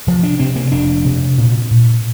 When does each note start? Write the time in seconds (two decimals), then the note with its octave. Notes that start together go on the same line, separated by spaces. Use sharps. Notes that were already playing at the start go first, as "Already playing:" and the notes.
0.07 C3 F3
0.23 D4
0.39 C3 C4
0.56 A#3
0.72 F1 D4
1.05 C3
1.38 A#2
1.71 A#2